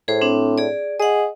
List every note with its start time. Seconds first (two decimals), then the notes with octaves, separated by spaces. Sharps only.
0.08 A2 G#4 C5
0.21 C4 D4
0.58 G#4 D5
1.00 G#4 D#5 F#5